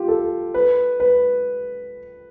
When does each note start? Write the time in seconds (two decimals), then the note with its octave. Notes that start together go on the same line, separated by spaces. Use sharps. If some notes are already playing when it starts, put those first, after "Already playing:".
Already playing: F4 G4
0.08 A4
0.54 B4
1.00 B4